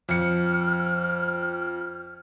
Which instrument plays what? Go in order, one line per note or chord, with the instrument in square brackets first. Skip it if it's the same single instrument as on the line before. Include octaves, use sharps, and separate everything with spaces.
[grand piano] F2 C#7 [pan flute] F6